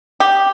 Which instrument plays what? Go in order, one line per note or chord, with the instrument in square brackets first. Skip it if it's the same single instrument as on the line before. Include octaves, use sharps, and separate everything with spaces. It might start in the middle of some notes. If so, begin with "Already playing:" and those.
[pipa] G4